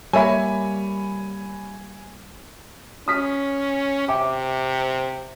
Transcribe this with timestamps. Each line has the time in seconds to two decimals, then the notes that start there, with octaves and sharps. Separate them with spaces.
0.13 G3 A#3 A4 C#5 E5 G#5 B5
3.08 C#4 D#6 F6 B6
4.08 C3 E5 G5 D6